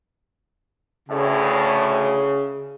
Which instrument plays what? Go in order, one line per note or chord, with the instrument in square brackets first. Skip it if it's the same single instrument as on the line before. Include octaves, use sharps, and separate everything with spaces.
[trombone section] D2 A2 [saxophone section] C#3